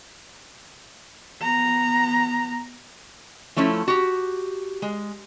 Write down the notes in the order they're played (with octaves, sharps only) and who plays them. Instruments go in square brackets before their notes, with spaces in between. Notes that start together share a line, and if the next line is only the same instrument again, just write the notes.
[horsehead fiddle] B3 A#5
[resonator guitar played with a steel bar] F3 A3 C#4 E4
F#4 G4
G#3